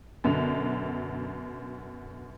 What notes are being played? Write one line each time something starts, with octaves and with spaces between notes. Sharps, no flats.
F#2 B2 D3